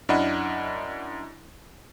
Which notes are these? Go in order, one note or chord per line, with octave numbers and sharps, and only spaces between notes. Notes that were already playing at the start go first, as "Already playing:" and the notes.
F#2 D4 E4 D#5 F#5 B5